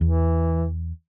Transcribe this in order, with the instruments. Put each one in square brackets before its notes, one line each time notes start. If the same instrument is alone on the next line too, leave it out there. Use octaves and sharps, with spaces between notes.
[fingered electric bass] E2 [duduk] E3